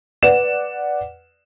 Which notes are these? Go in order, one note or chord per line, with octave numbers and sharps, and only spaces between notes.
B4 D5 F#5 E7